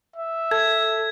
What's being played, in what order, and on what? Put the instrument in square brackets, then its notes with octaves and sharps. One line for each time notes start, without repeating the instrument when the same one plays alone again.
[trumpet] E5
[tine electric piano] A4 [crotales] G#6